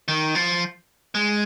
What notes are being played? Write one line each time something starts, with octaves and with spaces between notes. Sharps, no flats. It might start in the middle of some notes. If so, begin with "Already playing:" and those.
D#3
F3
G#3